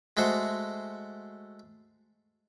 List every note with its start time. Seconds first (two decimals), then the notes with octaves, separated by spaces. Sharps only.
0.17 G#3 A3 F#4 C5